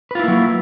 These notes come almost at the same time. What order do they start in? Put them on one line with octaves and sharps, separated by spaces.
B4 F4 E4 A#3 F#3